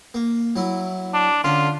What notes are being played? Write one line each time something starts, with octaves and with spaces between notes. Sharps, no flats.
A#3
F#3 E4
D4
D3 C#4 F4